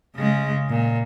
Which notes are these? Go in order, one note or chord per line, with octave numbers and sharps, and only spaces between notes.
C#3 G#3
A#2